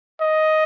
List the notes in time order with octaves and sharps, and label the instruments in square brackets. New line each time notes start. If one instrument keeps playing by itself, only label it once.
[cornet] D#5